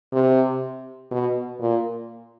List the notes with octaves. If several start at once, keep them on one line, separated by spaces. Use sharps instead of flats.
C3
B2
A#2